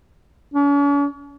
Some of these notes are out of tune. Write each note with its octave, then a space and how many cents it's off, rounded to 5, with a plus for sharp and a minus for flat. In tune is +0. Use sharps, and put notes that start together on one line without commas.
C#4 +45